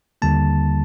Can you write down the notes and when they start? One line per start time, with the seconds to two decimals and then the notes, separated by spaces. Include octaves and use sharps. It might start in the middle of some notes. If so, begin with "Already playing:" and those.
0.22 D#2 D3 G3 A#3 A5